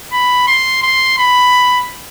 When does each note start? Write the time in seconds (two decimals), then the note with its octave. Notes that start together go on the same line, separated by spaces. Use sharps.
0.12 B5
0.47 C6
0.83 C6
1.18 B5